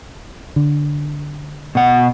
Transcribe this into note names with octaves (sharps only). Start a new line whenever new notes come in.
D3
B2 F#5